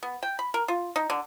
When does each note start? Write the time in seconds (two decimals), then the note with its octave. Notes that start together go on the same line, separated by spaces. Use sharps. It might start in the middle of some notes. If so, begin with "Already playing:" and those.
0.03 B3
0.23 G5
0.39 B5
0.54 A#4
0.68 F4
0.96 D#4
1.10 D3